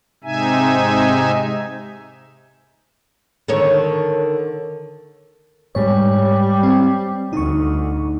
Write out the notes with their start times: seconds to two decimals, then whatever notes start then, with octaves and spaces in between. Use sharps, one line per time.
0.24 G#2 C3 D#4 E5 G#5
3.48 D3 D#3 C#5
5.75 G#2 G3 C#5
6.63 C4
7.33 D2 D#4 C#6